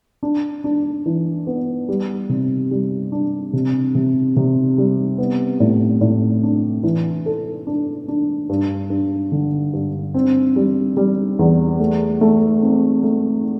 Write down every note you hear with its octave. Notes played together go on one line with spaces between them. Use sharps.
D4
D4
E3
B3
G3
C3
G3
D4
C3
C3
C3
G3
B3
A2
A2
D4
E3
A4
D4
D4
G2
G2
D3
G2
C4
G3
G3
E2
A3
A3
C4
A3